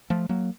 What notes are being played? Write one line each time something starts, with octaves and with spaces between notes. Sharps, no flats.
F3 A3
F#3 A#3